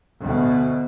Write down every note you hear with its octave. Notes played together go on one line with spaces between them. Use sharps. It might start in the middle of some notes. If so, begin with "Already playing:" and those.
D2 B2